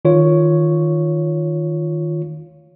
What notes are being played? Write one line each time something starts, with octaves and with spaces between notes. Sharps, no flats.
D#3 F4 C#5